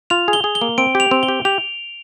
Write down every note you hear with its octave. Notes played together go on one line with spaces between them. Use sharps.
F4 F7
G#4
G7
G#4
G7
A#3
C4 D7
G4
F7
C4
G7
G4
G4 F7